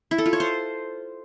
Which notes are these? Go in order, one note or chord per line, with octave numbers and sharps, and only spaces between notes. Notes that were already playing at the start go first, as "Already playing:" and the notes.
E4
A4
F4
C#5
C5